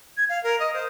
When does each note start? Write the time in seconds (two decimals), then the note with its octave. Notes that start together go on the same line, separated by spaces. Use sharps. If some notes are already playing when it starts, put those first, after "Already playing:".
0.17 G#6
0.29 F5
0.43 A#4
0.59 D#5
0.73 C5